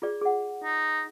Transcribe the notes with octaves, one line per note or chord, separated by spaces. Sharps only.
F4 G#4 D5
G#4 F#5
D#4